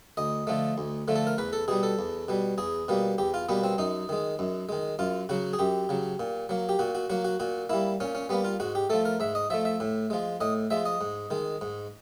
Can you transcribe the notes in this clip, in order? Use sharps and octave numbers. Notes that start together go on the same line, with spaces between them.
D2 D#5
D3 F3 A3
D2
D3 F3 A3
A4
A#4
E2 B4
A4
B2 G3 G#4
A4
E2
B2 G3
E2 G#4
B2 G3 A#3
E2 G4
F4
B2 G3 A#3 B3
C4
F#2 D#4
D#3 G#3
F#2
D#3 G#3
F#2 F4
C#3 F#3 F#4
G#4
F#2 G4
C#3 F#3
A#2
F#3 A#3
G4
A#2 F#4
F#4
F#3 A#3 F#4
F#4
A#2 F#4
G3 A#3 E4
A#2 C#4
C#4
G3 A#3 B3
F4
G#2 F#4
G4
F3 A3 A4
A#4
G#2 E5
D#5
F3 A3 E5
E5
A2
F3 G#3
A2 D#5
F3 G#3 E5
D#5
G#2
D#3 G#3
G#2